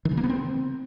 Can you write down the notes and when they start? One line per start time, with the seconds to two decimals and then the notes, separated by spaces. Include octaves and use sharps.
0.05 D#3
0.11 C#3
0.17 A#3
0.23 B3
0.29 C4